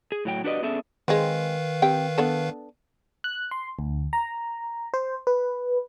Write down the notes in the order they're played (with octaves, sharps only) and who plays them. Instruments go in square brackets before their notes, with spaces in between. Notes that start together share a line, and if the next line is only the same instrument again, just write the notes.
[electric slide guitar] G#4
A2 F#3 G5
D4 F#4 G4 B4 D5 D#5
B3 C#4 D4 G#4 A4 E5
[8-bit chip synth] D#3 B4 F5 [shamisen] G#3 C4
[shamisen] C4 G4 G5
B3 D4 A4
[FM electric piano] F#6
C6
D2
A#5
C5
B4